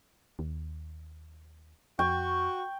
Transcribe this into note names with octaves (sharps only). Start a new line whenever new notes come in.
D#2
F2 F#4 G5 C#6